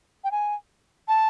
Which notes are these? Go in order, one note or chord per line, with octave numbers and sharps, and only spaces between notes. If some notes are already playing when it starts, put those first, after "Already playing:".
G5
G#5
A5